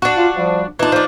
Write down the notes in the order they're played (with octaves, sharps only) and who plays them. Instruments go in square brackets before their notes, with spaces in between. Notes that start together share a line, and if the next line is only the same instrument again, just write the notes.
[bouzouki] D4 F#4
[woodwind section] F4
F3 G3
[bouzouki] E3 D4 [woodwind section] D#4 F4
[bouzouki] F3 D4